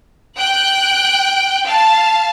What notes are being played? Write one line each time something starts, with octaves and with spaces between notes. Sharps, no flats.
G5 F#6
F5 A5